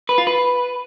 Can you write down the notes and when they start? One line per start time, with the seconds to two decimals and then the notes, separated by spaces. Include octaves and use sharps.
0.09 B4
0.18 F4
0.27 B4